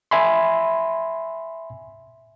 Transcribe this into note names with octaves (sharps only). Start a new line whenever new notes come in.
E5 G#5 B5 C6